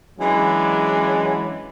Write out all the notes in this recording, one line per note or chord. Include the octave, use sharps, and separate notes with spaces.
E3 F#3 G#3 C#4 D4